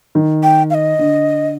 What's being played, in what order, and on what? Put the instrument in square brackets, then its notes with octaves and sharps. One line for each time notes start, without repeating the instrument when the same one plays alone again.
[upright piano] D#3
[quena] G5
F5
D#5
[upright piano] D3